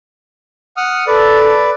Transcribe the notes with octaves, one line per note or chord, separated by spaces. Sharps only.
F#5 D#6 F6
A4 B4 D5